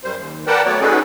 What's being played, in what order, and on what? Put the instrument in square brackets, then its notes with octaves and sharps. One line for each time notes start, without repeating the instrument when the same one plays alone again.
[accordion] F#2 G3 C5
D#2
A#4 B4 D5 F#5 G5 A5
F#3 A3 B3 C#5 D5
C#4 D#4 F#4 G#4 A4 B4